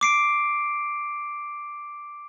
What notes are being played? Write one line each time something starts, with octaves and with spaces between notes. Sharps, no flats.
D6 C7 D7